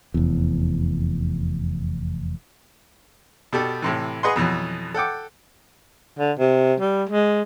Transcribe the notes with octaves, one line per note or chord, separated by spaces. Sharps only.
F1 E2
B2 G4 A4
A2 C3 E3
G#4 B4 D#5 F#5 C6
F2 B2 E3 F#3
A4 F#5 G5 D6
D3
C3
G3
G#3